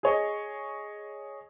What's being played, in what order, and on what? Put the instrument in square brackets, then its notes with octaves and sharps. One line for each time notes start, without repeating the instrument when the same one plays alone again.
[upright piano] G#4 C#5 D#5